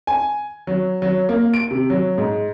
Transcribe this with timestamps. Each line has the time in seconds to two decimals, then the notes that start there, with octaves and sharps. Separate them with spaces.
0.07 G#5
0.67 F#3
1.02 F#3
1.29 A#3
1.54 D7
1.71 C3
1.90 F#3
2.18 G#2